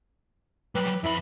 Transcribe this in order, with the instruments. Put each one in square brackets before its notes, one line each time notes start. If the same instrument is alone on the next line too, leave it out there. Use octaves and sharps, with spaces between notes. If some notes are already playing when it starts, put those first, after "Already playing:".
[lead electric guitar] F#3 G3 [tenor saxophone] B4
[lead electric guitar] F2 B5 [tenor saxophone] E4